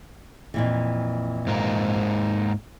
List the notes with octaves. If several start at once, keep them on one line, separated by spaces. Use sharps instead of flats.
F2 A#2 E3
G#2 A#3